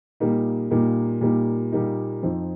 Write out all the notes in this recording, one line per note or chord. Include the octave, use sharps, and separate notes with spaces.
A#2 G3 A#3 D#4
A#2 G3 A#3 D#4
A#2 G3 A#3 D#4
A#2 G3 A#3 D#4
F2 F3 D#4